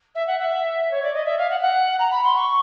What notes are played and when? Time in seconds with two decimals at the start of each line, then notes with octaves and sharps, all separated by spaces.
0.15 E5
0.27 F#5
0.39 E5
0.91 C#5
1.02 D5
1.14 D#5
1.24 E5
1.38 F5
1.50 F#5
1.58 F5
1.61 F#5
1.99 A#5
2.10 B5
2.24 C6
2.35 C#6